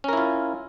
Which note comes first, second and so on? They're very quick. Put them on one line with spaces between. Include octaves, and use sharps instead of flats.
C#4 A#4 E4 F4